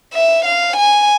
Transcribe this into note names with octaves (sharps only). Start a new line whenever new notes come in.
E5
F5
G#5